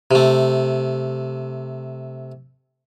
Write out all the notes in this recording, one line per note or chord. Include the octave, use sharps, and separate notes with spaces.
C3 A3